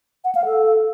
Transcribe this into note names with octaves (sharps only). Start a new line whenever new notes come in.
F#5
F5
A4